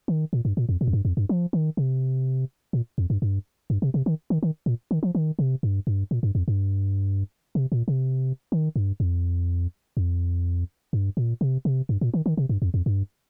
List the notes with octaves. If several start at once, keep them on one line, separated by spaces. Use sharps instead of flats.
D#3
A#2
G2
A#2
F2
A#2
F2
G2
F2
G2
F3
D#3
C3
A#2
F2
G2
G2
G2
C3
C3
D#3
D#3
D#3
A#2
D#3
F3
D#3
C3
G2
G2
A#2
G2
F2
G2
C3
A#2
C3
D#3
G2
F2
F2
G2
A#2
C3
C3
G2
A#2
D#3
D#3
C3
G2
F2
F2
G2